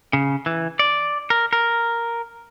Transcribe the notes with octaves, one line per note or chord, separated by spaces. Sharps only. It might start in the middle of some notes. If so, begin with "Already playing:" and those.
C#3
E3
D5
A#4
A#4